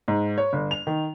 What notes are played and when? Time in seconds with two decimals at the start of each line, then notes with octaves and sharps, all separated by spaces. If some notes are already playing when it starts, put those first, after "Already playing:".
0.08 G#2
0.38 C#5
0.53 G1
0.71 F7
0.87 D#3